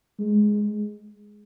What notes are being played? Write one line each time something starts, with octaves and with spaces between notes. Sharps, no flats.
G#3